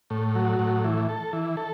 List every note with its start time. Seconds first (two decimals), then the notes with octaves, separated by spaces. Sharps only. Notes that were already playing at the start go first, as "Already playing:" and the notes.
0.10 A2
0.35 F#3
0.59 A2
0.84 E3
1.09 A4
1.33 E3
1.57 A4